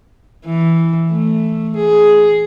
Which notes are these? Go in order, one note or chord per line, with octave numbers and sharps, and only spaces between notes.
E3
A3
G#4